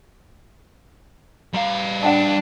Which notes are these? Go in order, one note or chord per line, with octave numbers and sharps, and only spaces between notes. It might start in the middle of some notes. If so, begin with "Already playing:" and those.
G3 F5 A#5
D4 F#5 G5 A5